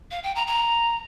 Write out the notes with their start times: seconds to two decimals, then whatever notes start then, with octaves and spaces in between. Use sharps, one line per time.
0.11 F5
0.23 G5
0.35 A#5
0.47 A#5